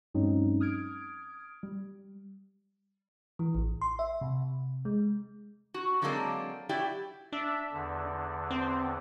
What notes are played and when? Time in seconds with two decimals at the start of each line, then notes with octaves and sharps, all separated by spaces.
0.14 G2 F#3 G#3 C4 C#4 D#4
0.60 D#6 F6 G#6 D7
1.63 G3
3.39 E3
3.55 A1
3.81 C6
3.99 E5
4.21 C3
4.85 G#3
5.74 F#4
6.02 D3 F#3 G#3 A#3 C4 D4
6.69 F#3 E4 G4 D5 E5
7.32 D4 E5
7.72 E2 D3
8.51 C4